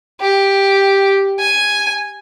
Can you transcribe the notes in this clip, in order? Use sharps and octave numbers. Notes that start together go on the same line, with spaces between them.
G4
G#5